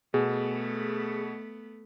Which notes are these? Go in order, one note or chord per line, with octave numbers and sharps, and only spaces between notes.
B2 A3 B3 G#4